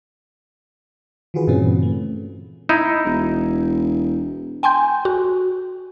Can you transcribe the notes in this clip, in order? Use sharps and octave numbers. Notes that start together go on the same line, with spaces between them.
D#3 E3 F4 F#4 G#4 B4
G2 A#2 C#3 E3 C4 C#4
A3
D#4 E4
E1
G5 G#5 C6 G6
F#4